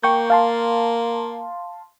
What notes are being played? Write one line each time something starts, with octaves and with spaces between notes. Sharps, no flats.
A#3 G5 C#6 G6
F5 A5 C6